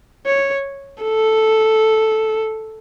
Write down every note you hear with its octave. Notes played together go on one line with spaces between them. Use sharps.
C#5
A4